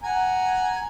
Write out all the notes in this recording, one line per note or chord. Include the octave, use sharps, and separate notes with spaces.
F#5 G#5 A#5